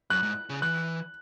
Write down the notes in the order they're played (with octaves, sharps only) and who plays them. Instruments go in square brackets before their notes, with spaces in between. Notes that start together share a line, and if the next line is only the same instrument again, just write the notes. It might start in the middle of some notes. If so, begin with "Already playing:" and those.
[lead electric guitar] F#2 [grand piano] F#6
[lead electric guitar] G#2
C#3
[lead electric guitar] E3 [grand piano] F#6